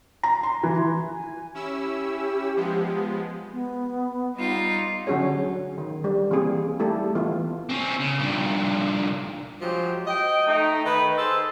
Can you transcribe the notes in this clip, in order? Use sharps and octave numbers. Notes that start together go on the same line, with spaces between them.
A#5
C6
E3
G#5
C#4 E4 G4 E6
F3 G#3 B3
B3
G3 D#4 F4
D3 F#3 C#4 F#4 G#4 C#5
D#3
G3
E3 A#3 C4 G#4
G3 A3 E4 G4 A4
E3 B3 F4
C4 C#4
C#3
G2 A#2
F3 F#3 G#3 G4
D#5 G5
A3 D#4
D#3 B4
G#4 A4 C5